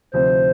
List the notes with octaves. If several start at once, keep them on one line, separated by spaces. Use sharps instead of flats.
D2 C3 F3 C4 D#4 C5